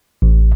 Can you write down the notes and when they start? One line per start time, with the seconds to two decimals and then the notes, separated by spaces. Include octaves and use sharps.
0.22 A1